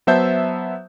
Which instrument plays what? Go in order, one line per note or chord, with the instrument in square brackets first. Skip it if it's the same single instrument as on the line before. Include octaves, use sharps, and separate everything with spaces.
[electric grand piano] F#3 B3 C5 E5 A5 G6